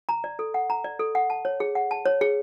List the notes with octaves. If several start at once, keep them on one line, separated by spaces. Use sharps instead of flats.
A#5
D5
A4
F#5
A#5
D5
A4
F#5
A5
C#5
G#4
F#5
A5
C#5
G#4